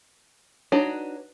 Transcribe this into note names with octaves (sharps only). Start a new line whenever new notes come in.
D4 D#4 F#4 B4 C#5